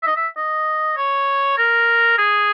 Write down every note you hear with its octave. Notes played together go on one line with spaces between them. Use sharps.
E5
D#5
E5
D#5
C#5
A#4
G#4